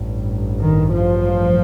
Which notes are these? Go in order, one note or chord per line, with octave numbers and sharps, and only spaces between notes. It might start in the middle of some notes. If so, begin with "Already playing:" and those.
Already playing: A1 G2
D#3
F3